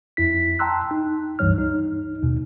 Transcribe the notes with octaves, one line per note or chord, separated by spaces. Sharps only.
F2 E4 B6
G5 A5 A#5 C6 E6 F#6
D#4
C#2 G2 E3 G3 C#5 F6
D#4
D#2 B2